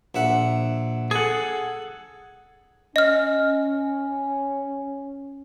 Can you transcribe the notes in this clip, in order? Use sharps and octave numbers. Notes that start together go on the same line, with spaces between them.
A#1 E5 F#5
G#4 A4 F#5
C#4 D#5 F6